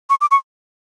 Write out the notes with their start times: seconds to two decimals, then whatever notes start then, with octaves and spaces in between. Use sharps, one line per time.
0.10 C#6
0.21 D6
0.31 C#6